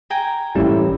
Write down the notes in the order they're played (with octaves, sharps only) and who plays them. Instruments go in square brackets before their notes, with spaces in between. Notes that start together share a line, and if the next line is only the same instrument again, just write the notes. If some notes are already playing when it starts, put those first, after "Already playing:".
[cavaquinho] G5 G#5 A#5
[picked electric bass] A1 A2 G3 [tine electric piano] A#3 C#4 G4 [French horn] E4